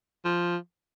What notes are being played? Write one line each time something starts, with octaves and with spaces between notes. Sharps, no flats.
F3